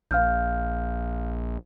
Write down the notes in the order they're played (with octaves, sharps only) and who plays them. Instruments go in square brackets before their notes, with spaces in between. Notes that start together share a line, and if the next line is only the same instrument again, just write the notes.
[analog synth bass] A#1 [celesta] F5 F6 G6